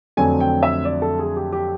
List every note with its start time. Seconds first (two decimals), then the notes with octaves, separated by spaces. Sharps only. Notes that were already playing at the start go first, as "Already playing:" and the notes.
0.17 F2 D3 F#3 A3 C4 G#5
0.40 G5
0.63 E5
0.85 D5
1.02 A4
1.19 G#4
1.36 G4
1.52 G4